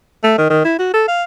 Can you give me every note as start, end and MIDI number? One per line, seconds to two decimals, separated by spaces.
0.23 0.37 57
0.38 0.46 51
0.50 0.62 51
0.65 0.77 64
0.79 0.92 66
0.94 1.05 69
1.08 1.23 77